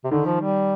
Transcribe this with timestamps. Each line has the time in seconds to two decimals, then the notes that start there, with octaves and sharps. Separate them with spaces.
0.04 C3
0.11 D3 D#3
0.26 F3
0.40 G3